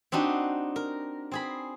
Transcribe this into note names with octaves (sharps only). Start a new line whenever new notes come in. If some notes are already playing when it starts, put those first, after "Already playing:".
C4 D4 D#4 F#4 G4
A#4
C4 G#4 B5